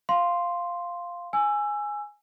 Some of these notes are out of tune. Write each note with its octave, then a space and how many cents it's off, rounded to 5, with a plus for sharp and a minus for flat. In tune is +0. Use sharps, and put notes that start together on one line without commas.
F5 +0 C6 +0
G#5 +0 E6 +20